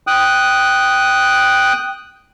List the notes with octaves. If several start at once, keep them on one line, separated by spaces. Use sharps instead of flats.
G5 D#6 F#6